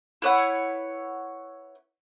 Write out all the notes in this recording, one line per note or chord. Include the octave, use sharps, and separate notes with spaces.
E4 B4 C#5 F#5